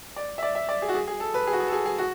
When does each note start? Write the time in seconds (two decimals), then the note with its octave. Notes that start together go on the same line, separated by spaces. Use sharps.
0.16 D5
0.38 E5
0.43 D5
0.55 E5
0.69 D5
0.82 G#4
0.88 F#4
0.95 G#4
1.07 G#4
1.20 A4
1.34 B4
1.47 G#4
1.53 F#4
1.60 G#4
1.68 A4
1.72 G#4
1.86 G#4
1.98 F#4